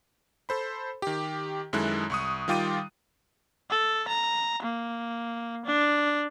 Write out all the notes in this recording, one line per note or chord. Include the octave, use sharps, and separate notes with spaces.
A4 C5 B5
D#3 G4
F#2 D#3 G#3 E4 A4 F#6
C2 C#6 D#6
D#3 G3 F4 G5 D6 D#7
A4
A#5
A#3
D4